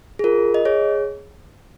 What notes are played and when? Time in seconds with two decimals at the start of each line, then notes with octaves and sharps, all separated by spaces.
0.19 G#4
0.24 F4 A#4
0.54 D#5
0.65 G#4 C#5